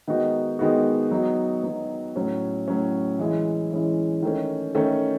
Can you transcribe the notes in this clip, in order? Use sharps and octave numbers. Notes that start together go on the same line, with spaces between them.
D#3 G#3 B3 D#4 F#4
D#3 G#3 B3 D#4 F#4
F#3 B3 D#4 F#4
F#3 B3 D#4 F#4
A2 F#3 C#4
A2 F#3 C#4
E3 G#3 C#4 E4
E3 G#3 C#4 E4
D#3 A3 C#4
D#3 A3 C#4